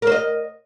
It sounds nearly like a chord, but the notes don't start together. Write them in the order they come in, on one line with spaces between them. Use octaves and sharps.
A#4 C5 D#5